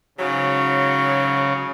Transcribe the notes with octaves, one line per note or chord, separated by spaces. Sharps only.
G#2 C#3 F#3